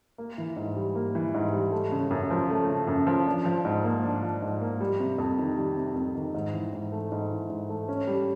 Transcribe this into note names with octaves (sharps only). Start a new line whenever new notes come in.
A#3
E3
G#2
G3
A#3
E3
G#2
G3
A3
C#3
F#2
F3
A3
C#3
F#2
F3
D4
F3
G#2
A#3
D4
F3
G#2
A#3
G3
C3
F2
D#3
G3
C3
F2
D#3
G#2
E3
G#2
A3
G#2
E3
G#2
A3
C#4
G3